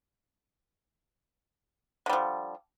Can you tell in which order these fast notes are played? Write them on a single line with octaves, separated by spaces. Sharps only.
D3 G3 F3